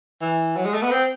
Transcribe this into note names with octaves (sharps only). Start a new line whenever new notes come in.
E3
F#3
G#3
A3
B3
C4